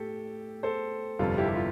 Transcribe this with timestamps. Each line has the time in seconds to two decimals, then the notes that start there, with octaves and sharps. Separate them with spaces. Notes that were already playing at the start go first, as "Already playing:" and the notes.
Already playing: A2 G4 A4
0.63 A4 C5
1.19 G1 F2 C3 G3 F4 A4
1.38 E4 G4
1.49 G4
1.56 F4